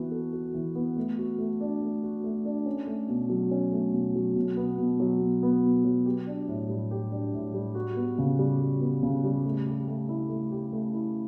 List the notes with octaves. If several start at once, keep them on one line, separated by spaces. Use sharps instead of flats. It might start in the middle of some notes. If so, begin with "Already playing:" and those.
Already playing: E3 B3 F#4
A4
F#4
E3
B3
A3
F#4
A3
D4
A3
F#4
A3
D4
C#4
A3
B2
F#3
C#4
A3
B2
F#3
B2
B3
B2
F#3
B2
B3
B2
F#3
G4
D4
A2
G3
G4
D4
A2
G3
F#4
B3
C#3
G3
F#4
B3
C#3
G3
A3
G4
A3
E4
A3
G4
A3
E4